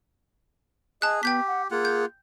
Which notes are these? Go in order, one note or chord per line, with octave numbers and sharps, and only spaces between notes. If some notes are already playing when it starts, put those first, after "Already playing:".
G#4 D#5 A5 F#6
B3 G4 G5 G6 B6
F#5
A#3 F4 G#4 F#5
G6